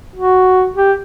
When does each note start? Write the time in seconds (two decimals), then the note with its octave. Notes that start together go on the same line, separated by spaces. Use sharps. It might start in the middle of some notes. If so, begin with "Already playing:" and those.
0.16 F#4
0.76 G4